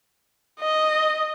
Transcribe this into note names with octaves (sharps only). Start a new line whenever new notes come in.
D#5